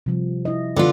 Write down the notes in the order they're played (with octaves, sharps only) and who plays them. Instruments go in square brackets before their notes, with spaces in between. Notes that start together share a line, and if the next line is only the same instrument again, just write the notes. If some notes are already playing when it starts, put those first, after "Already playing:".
[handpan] C3 F3 G3
E4 D#5
[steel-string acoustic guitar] D3 B3 F4